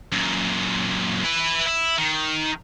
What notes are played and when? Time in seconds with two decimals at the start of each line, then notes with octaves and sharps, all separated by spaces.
0.12 F#2 A#2
1.24 E4 B4
1.67 E4
1.98 D#3